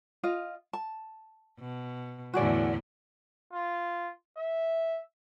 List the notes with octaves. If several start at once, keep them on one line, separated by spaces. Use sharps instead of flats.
F4 D#5 F5
A5
B2
E2 A2 D3 F#4 G#4 D5
F4
E5